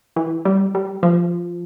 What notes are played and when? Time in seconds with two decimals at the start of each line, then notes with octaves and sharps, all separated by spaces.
0.16 E3
0.45 G3
0.75 G3
1.03 F3